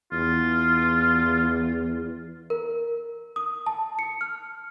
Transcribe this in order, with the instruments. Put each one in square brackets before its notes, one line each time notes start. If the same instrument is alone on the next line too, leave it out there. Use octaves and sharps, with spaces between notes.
[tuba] E2 [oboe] F4
[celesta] A#4
D#6
A5
C#7
F6